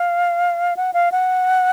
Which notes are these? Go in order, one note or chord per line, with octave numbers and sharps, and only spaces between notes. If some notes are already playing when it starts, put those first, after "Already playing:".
Already playing: F5
F#5
F5
F#5